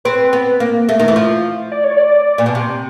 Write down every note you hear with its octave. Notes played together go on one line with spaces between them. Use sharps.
C4 B4
B3
A#3
A3
D#3
E3
F3
D5
C#5
D5
A#2
B2
C3